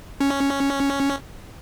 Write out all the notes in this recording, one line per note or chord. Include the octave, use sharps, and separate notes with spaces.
C#4